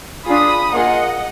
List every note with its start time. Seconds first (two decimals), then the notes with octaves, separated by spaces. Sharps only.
0.27 D4 F4 G#4 B5 D#6
0.72 A#3 F4 G#4 D#5 F#5